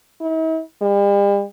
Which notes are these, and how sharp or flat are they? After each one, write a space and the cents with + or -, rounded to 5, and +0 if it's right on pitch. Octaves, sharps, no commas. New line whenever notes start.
E4 -45
G3 +45